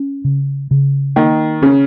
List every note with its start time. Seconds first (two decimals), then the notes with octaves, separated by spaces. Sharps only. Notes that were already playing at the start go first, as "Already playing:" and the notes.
Already playing: C#4
0.24 C#3
0.71 C#3
1.16 D#3 A#3
1.62 C#3 C#4